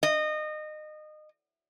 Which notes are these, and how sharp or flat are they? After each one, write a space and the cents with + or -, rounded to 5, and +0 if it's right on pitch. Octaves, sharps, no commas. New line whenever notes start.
D#5 -25